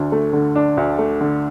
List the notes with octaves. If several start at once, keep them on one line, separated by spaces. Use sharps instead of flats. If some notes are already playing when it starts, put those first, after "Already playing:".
Already playing: D2 D3 D4
A3
D3
D4
D2
A3
D3